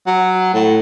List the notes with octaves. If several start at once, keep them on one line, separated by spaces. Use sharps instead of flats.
F#3
A2